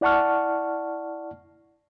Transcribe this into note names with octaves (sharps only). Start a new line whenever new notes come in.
E4 D5 F#5 A5 C#6 F6